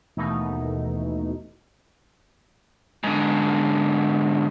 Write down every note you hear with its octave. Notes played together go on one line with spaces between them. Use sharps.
D#2 B2 E3 A3 D#4
G#2 D3